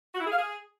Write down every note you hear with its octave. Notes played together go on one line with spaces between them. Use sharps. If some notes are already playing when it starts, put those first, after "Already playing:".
F#4
E4
G#4
F5
G#4